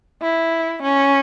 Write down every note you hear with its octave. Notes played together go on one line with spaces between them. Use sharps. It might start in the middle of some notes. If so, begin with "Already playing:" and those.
E4
C#4